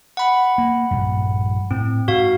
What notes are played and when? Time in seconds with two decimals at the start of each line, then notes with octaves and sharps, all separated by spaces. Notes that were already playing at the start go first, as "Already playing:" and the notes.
0.17 F#5 B5
0.58 A#3
0.91 A#1 G2
1.71 A2 C4
2.08 G#2 F#4 F5